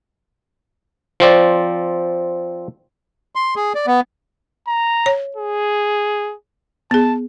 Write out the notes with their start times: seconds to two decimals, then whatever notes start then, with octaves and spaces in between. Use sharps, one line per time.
1.20 F3 C4 D5
3.35 C6
3.56 G#4
3.75 D5
3.87 B3
4.68 A#5
5.06 C#5
5.36 G#4
6.91 B3 G#4 A5